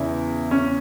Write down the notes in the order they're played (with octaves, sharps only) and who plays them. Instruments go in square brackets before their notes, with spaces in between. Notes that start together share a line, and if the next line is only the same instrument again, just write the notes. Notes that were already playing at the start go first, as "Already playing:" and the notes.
Already playing: [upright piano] E2 C#3 E4
C#4